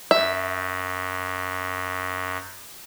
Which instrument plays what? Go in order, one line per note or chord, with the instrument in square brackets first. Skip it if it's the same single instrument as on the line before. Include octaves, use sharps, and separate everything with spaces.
[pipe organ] F#2 [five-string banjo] E5